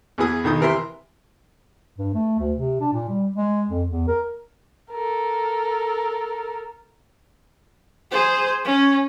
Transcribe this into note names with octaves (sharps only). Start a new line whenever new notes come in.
E2 E3 B3 E4 G#4 D#6
B1 D#3 D#6
C3 E3 A#4 B4 E5 C6
G2
A3
D2
C3
D4
A#2
G3
G#3
F2
E2
A#4
A4 A#4
G#4 C5
C#4